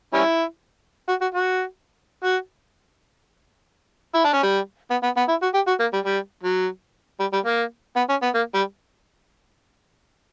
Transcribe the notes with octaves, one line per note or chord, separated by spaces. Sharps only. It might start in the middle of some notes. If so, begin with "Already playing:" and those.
G3 C#4 E4
F#4
F#4
F#4
F#4
E4
D4
C#4
G3
B3
B3
B3
E4
F#4
G4
F#4
A#3
G3
G3
F#3
G3
G3
A#3
B3
C#4
B3
A#3
G3